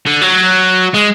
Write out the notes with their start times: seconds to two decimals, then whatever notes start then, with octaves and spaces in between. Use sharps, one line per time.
0.06 D3
0.21 F#3
0.94 G#3